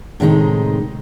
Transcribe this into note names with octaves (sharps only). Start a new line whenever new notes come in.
A2 C3 D#3 G#3 C4 D#4